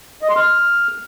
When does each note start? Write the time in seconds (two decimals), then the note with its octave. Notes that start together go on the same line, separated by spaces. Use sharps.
0.22 D#5
0.29 C6
0.37 F6